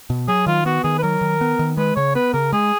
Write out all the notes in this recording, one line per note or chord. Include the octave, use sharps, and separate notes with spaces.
B2
F#3 G#4
D#3 F4
B3 F#4
D#3 G#4
B4
F#3 A#4
D#3
B3
D#3
G#3 B4
C#3 C#5
B3 B4
C#3 A#4
G#3 G#4